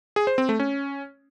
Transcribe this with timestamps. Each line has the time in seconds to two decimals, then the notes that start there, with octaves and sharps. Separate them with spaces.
0.16 G#4
0.27 C5
0.38 C4
0.49 A3
0.60 C#4